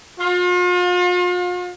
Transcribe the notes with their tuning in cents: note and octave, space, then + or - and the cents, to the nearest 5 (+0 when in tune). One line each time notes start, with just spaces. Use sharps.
F4 +40